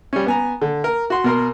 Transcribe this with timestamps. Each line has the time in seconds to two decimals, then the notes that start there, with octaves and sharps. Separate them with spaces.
0.13 G3 C#4
0.26 B3 G#5 A#5
0.62 D3
0.84 A#4
1.10 F#4 C6
1.24 B2 A#4 C6